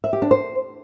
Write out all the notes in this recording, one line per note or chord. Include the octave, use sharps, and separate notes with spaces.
E5
G4
D4
C5